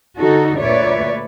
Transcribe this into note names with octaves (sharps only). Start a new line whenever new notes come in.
D3 D#4 F#4 A4
D2 A#2 B4 C#5 D5 E5